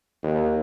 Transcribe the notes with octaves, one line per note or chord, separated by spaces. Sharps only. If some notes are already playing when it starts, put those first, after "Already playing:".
D#2